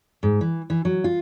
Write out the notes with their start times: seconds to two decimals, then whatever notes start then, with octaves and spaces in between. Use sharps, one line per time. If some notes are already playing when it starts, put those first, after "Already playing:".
0.23 G#2
0.41 E3
0.70 E3
0.85 F#3
1.04 F4